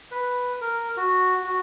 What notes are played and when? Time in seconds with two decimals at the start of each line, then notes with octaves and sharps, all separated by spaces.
0.11 B4
0.61 A#4
0.97 F#4
1.44 F#4